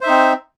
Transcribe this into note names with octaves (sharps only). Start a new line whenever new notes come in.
C4 D#4 C5 E5